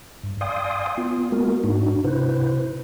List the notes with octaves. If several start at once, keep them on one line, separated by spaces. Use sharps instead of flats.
G2
D5 F5 G5 G#5 C6 D#6
B3 F4
G#3 A#3 B3 F#4 A#4
G#2 D4 D#4 F#4
C3 E4 B4 C5